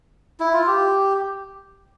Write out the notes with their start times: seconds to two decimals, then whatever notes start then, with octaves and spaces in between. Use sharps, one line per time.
0.40 E4
0.53 F4
0.67 G4